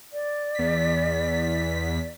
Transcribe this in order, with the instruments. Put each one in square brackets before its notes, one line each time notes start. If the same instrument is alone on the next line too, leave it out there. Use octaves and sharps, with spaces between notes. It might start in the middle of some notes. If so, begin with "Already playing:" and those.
[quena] D5
[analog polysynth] E2 B6